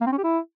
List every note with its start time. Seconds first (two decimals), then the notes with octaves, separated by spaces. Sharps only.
0.01 A#3
0.07 C4
0.12 C#4
0.18 G4
0.24 E4